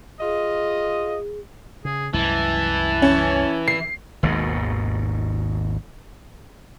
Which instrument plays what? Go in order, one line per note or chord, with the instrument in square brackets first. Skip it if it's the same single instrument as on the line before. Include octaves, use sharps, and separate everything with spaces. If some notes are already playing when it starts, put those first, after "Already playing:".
[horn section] F4 D#5 [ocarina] G#4
[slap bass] C#3 [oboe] G#4
[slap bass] C2 F#2 G#3 [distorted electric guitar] E3 [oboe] A5
[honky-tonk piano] C#4
C7
[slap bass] G#1 D#2 G#2 B2